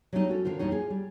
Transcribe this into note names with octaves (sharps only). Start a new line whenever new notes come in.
F#3 G3 A3 C#4 D#4
C#4 F#4 A4
D3 D#3 F4 C5
D#2 A2 G3 D#4 C#5
F4 G#4
G3